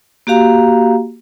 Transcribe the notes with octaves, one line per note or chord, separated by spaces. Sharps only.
A#3 F#4 G4 F5 A#5